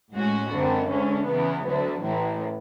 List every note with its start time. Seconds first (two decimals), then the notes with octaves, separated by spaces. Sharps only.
0.13 A2 G#3 C#4 F#4
0.51 G#1 F#2 D3
0.89 D2 D3 G#3 C#4
1.26 E2 C#3 E3 B3
1.64 D2 D3 F#3
2.01 A1 A2 E3